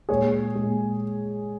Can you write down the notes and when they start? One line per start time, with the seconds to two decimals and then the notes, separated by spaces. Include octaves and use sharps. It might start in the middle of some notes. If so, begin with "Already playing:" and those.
0.09 A#2 G#3 G#4 C#5
0.55 A#2 G#3